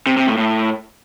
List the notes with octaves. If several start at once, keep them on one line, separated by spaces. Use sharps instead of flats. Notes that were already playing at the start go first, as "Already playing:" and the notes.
C3
C3
A2
A2